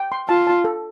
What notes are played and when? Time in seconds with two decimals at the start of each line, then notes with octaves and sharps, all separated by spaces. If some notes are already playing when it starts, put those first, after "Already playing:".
Already playing: G5
0.12 C6
0.29 F4 A5
0.47 A5
0.64 A4